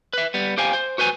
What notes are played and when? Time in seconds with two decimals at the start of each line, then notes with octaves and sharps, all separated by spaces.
0.13 B4 E5
0.34 G3 B3
0.58 G4 C5 F5 G5 G#5
0.73 C5
0.98 F#4 B4 C5 G#5